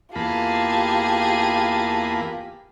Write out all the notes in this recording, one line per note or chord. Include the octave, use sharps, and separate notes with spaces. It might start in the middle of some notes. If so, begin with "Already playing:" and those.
E2 A#3 F4 G4 G#4 A5 B5